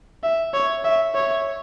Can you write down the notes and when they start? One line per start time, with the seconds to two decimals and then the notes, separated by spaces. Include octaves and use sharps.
0.24 E5
0.54 C#5
0.85 E5
1.15 C#5